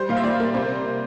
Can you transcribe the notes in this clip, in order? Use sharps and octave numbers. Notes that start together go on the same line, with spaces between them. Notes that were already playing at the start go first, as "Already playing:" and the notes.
Already playing: G3 C5
A#2 F5
E5
A#2 D5
A#3
C3 C5